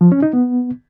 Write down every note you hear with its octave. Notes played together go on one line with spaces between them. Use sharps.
F3
C#4
D#4
B3